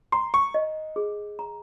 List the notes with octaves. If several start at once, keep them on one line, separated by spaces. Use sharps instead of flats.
A#5 C6
C#6
D#5
G#4
A#5